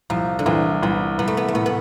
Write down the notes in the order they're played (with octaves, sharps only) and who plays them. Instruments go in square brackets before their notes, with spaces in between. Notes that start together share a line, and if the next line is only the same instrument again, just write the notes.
[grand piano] C2 [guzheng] F3
[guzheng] D3
[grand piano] C2 [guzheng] E3
[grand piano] C2 [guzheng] B3
[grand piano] C2 [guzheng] B3
[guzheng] A3
B3
A3
[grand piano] A2 [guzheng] B3
[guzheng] B3